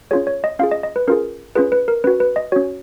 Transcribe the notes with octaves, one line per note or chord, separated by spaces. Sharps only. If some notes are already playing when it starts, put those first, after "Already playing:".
C#4 F4 G#4 C#5
C#5
D#5
C#4 F4 G#4 F5
D#5
D#5
B4
C#4 F4 G#4 A#4
C#4 F4 G#4 B4
B4
A#4
C#4 F#4 B4
B4
D#5
C#4 F#4 C#5